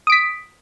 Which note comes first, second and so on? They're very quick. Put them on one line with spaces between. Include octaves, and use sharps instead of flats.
D#6 D7 B6